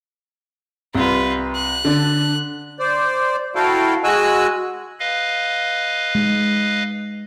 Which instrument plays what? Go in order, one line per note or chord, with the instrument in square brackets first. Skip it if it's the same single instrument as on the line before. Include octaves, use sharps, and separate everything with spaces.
[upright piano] C2 [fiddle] F4 B4
[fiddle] F#6
[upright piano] D3 D4
[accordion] C5 D5
E4 F#4 A4 F5 G5
G#3 F#4 D#5 G#5 E6 F#6
[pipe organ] B4 D#5 F5
[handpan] G#3